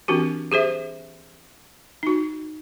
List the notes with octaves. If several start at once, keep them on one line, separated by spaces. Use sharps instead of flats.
E3 C4 D4 F#4 G4
G4 G#4 C5 E5
D#4 F#4